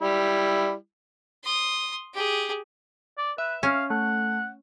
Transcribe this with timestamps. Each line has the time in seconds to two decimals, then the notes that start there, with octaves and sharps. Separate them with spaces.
0.01 G3 E4
1.44 C6 D#6
2.13 G4 G#4
3.17 D5
3.38 B4 E5
3.63 C#4 F5
3.90 A3 F#5